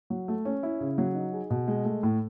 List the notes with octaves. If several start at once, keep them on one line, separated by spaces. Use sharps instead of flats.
F#3
A3
C#4
E4
C#3
F#3
D#4
G#4
B2
G#3
A3
A2